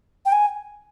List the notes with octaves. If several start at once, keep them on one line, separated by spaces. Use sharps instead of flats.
G5
G#5